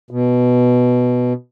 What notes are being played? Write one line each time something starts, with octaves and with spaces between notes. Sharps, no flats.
B2